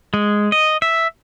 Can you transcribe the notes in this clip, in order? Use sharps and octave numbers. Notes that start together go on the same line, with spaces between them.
G#3
D#5
E5